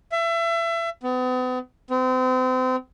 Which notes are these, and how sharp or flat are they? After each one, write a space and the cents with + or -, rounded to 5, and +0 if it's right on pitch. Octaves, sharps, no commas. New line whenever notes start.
E5 +30
B3 +40
C4 -35